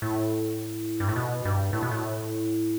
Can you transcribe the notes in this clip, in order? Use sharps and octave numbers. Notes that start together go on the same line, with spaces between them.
A2
G2
A2
B2
G2
A2
B2
A2